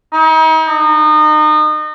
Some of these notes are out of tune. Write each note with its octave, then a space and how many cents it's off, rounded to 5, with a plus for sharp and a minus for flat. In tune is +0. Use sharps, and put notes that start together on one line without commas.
D#4 +40
D#4 -30